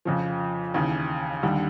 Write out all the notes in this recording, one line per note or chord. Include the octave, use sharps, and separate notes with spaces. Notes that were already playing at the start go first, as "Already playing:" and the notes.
F2 C#3 F3
D#2 C#3 E3
D#2 D3 G3